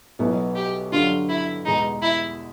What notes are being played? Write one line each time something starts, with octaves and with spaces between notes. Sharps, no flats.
B1 B2 F#3 B3 E4
G4
G2 D3 F#3 F4
E4
E2 B2 G#3 D#4
E4